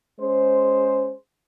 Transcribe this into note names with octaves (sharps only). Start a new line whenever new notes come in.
G#3 C#4 G#4 C5